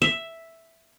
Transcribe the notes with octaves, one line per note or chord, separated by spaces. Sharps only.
E5